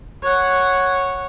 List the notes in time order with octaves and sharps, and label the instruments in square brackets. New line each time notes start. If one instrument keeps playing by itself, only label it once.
[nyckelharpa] C#5 F#5